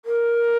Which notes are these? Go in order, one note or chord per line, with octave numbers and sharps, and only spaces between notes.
A#4